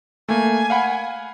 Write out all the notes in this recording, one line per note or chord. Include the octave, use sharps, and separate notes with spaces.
A3 A#3 G#5
F5 F#5 B5